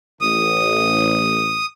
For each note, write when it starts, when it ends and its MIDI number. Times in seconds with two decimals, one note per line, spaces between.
0.21 1.59 33
0.21 1.66 87